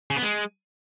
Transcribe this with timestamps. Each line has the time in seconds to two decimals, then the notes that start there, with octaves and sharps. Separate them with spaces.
0.10 C#3
0.17 B3
0.23 G#3